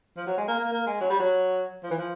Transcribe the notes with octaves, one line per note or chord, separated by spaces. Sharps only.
F3
F#3
G#3
A#3
A#3
A#3
G#3
F#3
G3
F#3
F3
E3
F3